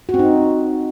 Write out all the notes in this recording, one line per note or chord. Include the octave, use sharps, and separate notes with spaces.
F#4
C4
D#4